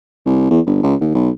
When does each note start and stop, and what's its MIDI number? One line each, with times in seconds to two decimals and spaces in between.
0.26 0.47 36
0.51 0.60 40
0.66 0.81 31
0.83 0.95 37
1.01 1.11 39
1.15 1.30 35